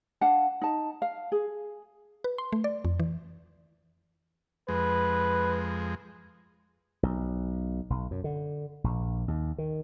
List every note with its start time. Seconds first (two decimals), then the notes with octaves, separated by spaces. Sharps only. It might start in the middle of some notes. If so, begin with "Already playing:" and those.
0.21 D4 F5 F#5 A5
0.62 D#4 A5
1.02 F5
1.32 G#4
2.24 B4
2.38 C6
2.53 A3
2.64 D5
2.85 F2
3.00 E3
4.69 F2 G#3 B4
7.03 B1
7.90 B1
8.11 F#2
8.24 D3
8.84 A#1
9.28 D#2
9.58 D#3